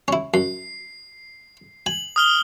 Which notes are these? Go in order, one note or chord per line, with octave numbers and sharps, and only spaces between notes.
C#4 E4
F#2 C7
G#5 F#7
D#6 F6 G7